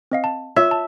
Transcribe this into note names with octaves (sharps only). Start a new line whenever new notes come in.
C4 D#5 F5
A5
F4 C#5 E5
A5